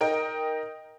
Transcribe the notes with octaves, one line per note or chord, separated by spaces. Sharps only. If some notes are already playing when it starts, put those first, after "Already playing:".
D#4 A#4 D#5 G5